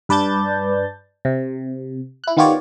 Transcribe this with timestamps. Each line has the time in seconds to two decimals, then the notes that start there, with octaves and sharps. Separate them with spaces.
0.09 G2 B4 D5 A5 G6 A6
1.25 C3
2.24 E4 F#6
2.37 D#3 B3 F4 G4 C#5 D5